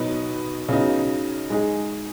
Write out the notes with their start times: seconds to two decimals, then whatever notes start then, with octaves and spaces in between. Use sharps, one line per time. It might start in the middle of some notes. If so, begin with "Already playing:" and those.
Already playing: B2 F#3 D#4 B4
0.69 C#3 F#3 B3 D#4
1.50 G#3 D#4 G#4